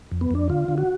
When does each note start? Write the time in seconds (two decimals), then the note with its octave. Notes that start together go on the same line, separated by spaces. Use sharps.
0.11 F2
0.21 B3
0.31 F2 D4
0.49 D3 F4
0.68 D3
0.78 F#4